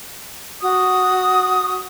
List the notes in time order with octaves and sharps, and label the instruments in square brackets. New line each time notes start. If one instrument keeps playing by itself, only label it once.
[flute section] F#4 D#6